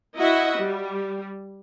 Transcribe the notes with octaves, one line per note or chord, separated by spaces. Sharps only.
E4 F#4 D#5 E5 F#5
G3